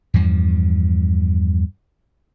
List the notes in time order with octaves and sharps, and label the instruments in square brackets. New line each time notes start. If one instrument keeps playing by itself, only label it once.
[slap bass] E2 G2 F3